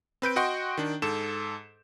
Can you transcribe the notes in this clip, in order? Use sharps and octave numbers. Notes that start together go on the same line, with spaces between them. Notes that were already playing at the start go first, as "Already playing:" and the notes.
C4 B4 G6 D7
F#4 D#5 F#5 G5 C6 C#6
D#3 D4
G#2 A4 E7